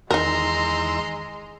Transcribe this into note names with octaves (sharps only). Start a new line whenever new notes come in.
E2 D#3 G#3 D#4 A#4 A#5 C6 E6